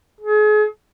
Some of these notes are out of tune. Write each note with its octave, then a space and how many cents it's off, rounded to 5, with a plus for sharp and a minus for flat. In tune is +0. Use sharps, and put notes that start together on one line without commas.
G#4 +35